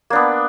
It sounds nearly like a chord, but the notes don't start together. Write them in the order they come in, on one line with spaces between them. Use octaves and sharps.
A#3 D4 B3